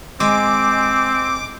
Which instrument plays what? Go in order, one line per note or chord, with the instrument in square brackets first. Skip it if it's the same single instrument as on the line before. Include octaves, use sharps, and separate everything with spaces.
[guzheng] G#3 [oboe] C4 [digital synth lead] D6